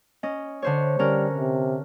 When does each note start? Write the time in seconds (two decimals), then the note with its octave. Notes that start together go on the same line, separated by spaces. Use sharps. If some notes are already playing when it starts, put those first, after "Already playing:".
0.23 C#4 D#5
0.62 D3 C5 C#5
0.99 D3 G3 C#4 A#4
1.35 C3